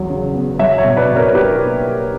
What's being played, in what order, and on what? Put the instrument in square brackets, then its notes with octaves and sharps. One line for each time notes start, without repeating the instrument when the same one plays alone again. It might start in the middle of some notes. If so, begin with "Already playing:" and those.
Already playing: [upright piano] E2 F#3
C#3
B3
F#3 C#5 E5
C#5 E5
B2
B4 D5
B2
A#4 C#5
A#3 G4 B4